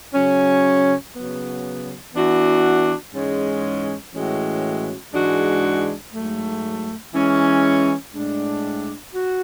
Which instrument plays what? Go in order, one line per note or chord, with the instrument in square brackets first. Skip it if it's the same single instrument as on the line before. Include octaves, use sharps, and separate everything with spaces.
[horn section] C#3 F#3 C#4
C#3 F#3 B3
E3 B3 D4 F#4
G#2 E3 G#3 C#4
A2 E3 G#3 C#4 F#4
G#2 E3 G#3 D4 F#4
G#2 F#3 A3
E3 G#3 C#4
A2 G#3 D4
F#4